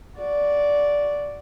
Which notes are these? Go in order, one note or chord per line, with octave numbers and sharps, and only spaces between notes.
F#4 D5